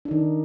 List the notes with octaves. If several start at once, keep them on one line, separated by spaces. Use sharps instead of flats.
D#3 D4 D#4